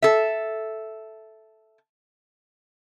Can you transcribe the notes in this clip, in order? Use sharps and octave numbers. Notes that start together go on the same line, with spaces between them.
A4 E5